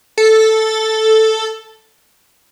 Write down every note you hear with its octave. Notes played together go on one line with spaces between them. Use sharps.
A4